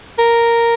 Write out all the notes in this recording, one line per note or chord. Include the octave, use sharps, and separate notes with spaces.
A#4